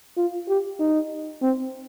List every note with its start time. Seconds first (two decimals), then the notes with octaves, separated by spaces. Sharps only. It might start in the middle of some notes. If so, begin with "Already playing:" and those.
0.17 F4
0.48 G4
0.80 D#4
1.42 C4